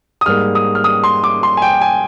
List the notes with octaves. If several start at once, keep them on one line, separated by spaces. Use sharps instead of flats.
D#6
G#2 G3 A#3 F6
D#6
F6
D#6
C6
D6
C6
G#5
G5
G#5